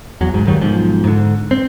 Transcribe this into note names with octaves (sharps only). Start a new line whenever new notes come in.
E2 F#3
C#2 G#2
G2 D#3 F#3 G3
B1 G#2 F3
G#2 D3
C4